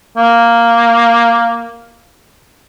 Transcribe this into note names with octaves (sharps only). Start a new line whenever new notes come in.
A#3